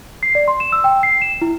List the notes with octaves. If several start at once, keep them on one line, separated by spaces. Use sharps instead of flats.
C7
D5
C6
E7
E6
G5
C7
E7
E4